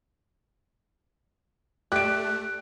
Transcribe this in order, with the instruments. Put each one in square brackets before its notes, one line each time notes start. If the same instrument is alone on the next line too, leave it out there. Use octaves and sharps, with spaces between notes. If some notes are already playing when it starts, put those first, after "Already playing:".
[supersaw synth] A3 [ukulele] G4 E5 [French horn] D5 [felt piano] F#6 D7